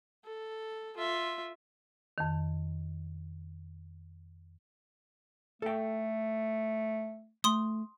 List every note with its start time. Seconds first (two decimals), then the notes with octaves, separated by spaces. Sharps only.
0.25 A4
0.97 F4 E5
2.18 F2 D#3
5.62 A3 A4 G5
7.44 A3 C6 D#6